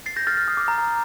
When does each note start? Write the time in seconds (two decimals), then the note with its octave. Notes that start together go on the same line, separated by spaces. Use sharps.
0.06 A6 C7
0.16 G6 A#6
0.27 F6 A6
0.37 F6
0.48 D#6
0.57 D6
0.68 A#5
0.78 A#5